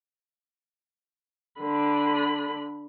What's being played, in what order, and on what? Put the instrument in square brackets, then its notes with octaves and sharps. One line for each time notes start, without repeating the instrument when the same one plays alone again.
[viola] D3 B5